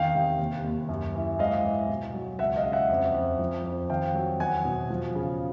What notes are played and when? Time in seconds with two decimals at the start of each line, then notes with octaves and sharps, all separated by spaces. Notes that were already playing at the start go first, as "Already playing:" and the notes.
Already playing: E2 D#3 F5 G5
0.15 C3
0.39 D#2
0.64 D#2
0.89 F#2
1.15 E3
1.39 G#2 D#5 F5
1.65 E3
1.89 B2
2.14 F#3
2.39 C#2 E5 F#5
2.56 D#5 F5
2.65 C#3
2.72 E5 F#5
2.89 F2
3.14 F2
3.39 F3
3.64 F2
3.89 D#3 F5 G5
4.14 F#3
4.39 E2 F#5 G#5
4.65 B2
4.90 F3
5.15 C#3